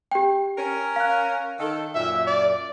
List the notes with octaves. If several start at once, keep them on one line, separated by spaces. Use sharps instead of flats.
G4 G5
C#4 A#4
F5 F#6
D#3 A4
F#2 A#2 E5
D5